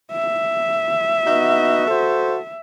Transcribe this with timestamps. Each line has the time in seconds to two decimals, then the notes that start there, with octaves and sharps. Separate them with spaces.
0.12 E5
1.26 B3 D#4 F#4
1.87 F#4 A4 C5